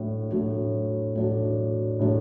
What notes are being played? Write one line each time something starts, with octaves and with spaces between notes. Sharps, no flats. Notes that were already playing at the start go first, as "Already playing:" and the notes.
Already playing: A2 F#3 D4 F#4
A2 F#3 D4 F#4
A2 F#3 D4 F#4
A2 F#3 D4 F#4